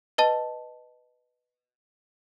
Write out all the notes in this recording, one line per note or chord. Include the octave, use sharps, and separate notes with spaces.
B4 D#5 A5